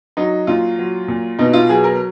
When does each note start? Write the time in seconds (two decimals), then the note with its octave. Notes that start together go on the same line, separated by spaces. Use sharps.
0.17 F#3 D#4
0.47 A#2 F4
0.79 F#3
1.08 A#2
1.39 B2 D#4
1.53 F4
1.69 F#3 G#4
1.84 A#4